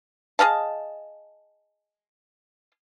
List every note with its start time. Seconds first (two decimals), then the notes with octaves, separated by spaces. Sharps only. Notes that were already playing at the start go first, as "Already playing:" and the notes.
0.39 G#4 D#5 F5 A5